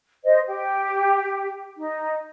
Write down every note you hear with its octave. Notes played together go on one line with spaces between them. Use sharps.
C5 D#5
G4 G5
D#4